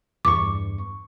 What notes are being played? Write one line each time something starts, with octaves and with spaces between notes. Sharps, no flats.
E2 G2 C#6 D6